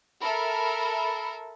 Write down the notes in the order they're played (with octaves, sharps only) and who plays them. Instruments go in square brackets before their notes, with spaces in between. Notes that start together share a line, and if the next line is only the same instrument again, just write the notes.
[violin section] A4 A#4 E5 [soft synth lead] B5